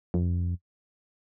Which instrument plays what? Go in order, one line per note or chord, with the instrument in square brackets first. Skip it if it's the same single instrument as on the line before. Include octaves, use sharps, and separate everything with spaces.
[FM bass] F2